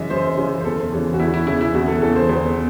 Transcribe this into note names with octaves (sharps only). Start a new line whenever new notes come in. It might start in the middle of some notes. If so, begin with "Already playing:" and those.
Already playing: F#2 C#3 E3 D#5 E5
F#2 C5
C#3 E3
C5
E2 A4
C#3 E3
F#4
E2 E4
E4
C#3 E3 E4
E4
E2 F#4
A4
C#3 E3 A4
C5
E2 C5